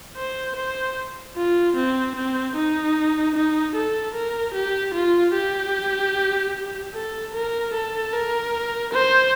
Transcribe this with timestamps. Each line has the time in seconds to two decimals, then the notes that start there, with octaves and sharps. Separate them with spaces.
0.16 C5
0.56 C5
1.36 F4
1.76 C4
2.16 C4
2.56 D#4
3.35 D#4
3.75 A4
4.15 A#4
4.54 G4
4.94 F4
5.34 G4
6.93 A4
7.34 A#4
7.74 A4
8.13 A#4
8.93 C5